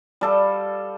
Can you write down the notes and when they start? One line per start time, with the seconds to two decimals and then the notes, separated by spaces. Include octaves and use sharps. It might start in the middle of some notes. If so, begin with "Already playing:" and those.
0.21 G3 A4 F5